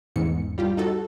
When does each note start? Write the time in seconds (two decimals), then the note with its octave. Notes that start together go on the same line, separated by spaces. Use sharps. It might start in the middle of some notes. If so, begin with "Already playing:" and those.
0.16 A1 E2 G#2 C#7
0.58 G3 F4 G4
0.77 D#4 F#4 A4